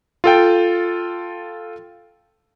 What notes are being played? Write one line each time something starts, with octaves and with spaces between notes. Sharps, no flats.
F4 A4 G5